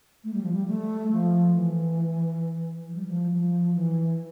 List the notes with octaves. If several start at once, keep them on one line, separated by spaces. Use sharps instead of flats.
A3
G3
F3
G3
A3
F3
E3
F3
G3
F3
F3
E3